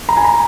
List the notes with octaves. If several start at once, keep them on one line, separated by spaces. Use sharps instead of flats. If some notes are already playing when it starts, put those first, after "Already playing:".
A#5
G#5
A#5